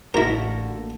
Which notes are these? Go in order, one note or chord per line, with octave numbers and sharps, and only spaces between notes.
A1 D3 A#3 E4 F#4 A#4 A#5